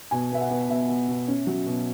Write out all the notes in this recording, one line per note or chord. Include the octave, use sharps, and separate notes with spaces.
B2 G#5
B3 E5
F#5
B3
B2 E5
B3
B2
C#4
F#3
B2